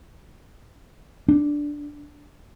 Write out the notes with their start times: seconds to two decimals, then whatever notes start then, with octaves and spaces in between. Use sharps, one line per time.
1.28 D4